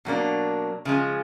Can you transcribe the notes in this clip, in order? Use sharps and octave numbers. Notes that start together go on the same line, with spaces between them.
B2 F#3 A#3 D4
C#3 F3 G#3